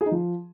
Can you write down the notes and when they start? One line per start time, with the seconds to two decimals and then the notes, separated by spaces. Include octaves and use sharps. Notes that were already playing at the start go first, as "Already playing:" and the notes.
0.01 G#4
0.06 D#4
0.11 F3